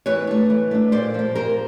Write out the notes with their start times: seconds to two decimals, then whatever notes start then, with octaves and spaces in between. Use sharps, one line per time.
0.06 E3 B4 C#5
0.27 A3 D4
0.50 E3
0.71 A3 D4
0.92 A#2 C5 D5
1.14 F3 A#3
1.35 A#2 A#4 C5